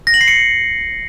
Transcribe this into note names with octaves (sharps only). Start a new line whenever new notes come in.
A#6
F#7
C7
C#7